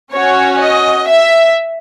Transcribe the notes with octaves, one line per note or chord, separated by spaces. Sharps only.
C#4 F#4 C#5
D#5
E5